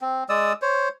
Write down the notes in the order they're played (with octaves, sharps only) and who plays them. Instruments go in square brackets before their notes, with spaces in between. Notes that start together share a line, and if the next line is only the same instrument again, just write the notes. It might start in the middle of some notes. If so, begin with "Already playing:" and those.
[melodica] C4
G#3 D5 D#6 E6
C5 C#5